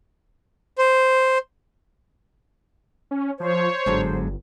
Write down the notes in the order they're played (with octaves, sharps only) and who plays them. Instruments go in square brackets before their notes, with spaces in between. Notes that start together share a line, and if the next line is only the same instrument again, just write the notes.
[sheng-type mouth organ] C5
[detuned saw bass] C#4
[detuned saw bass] F3 [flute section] C5 [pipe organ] C#5
[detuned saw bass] G1 [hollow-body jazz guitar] G#2 D3 F#3